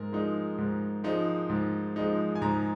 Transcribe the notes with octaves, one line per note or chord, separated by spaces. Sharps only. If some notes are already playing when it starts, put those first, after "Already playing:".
Already playing: G#2 A#4
F3 G#3 D#4
G#2
F3 G#3 D#4
G#2
F3 G#3 D#4
G#5
G#2 A#5